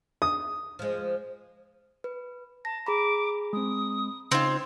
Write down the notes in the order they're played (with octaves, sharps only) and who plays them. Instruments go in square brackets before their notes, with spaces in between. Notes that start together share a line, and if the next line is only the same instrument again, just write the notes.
[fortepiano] D#6
[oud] F3 G#3
[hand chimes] B4
[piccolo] A5 [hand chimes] A#6
[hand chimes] G#4 A#5 B5 [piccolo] D6
[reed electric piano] G#3 C4 [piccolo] D#6
[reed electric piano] C#3 D#4 [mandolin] C4 F4 [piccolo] G#6